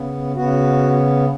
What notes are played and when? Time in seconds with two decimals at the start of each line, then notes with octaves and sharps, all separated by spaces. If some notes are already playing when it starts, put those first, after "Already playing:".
Already playing: C#3 B3
0.36 C#3 B3 F#4